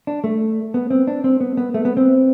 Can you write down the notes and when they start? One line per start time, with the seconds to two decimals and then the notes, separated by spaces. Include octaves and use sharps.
0.07 D4
0.24 A3
0.74 B3
0.91 C4
1.07 D4
1.24 C4
1.41 B3
1.57 B3
1.74 A3
1.85 B3
1.97 C4